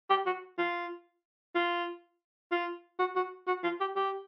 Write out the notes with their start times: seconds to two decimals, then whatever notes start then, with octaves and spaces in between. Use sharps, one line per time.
0.10 G4
0.26 F#4
0.58 F4
1.55 F4
2.52 F4
2.99 F#4
3.16 F#4
3.47 F#4
3.63 F4
3.80 G4
3.96 G4